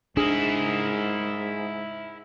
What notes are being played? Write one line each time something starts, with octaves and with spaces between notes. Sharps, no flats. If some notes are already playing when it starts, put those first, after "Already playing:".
G#2 D4 E4 G#4 A#4